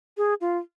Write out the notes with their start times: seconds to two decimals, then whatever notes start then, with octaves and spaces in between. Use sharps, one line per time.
0.17 G#4
0.41 F4